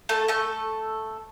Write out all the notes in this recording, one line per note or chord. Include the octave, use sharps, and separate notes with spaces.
A3 A4
A3 A4